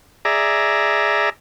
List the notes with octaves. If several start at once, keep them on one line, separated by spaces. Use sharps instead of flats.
G#4 D5 E5 A#5